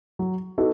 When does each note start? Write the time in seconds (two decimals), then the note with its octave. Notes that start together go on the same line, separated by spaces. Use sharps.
0.19 F#3
0.58 B3 D#4 F#4 A4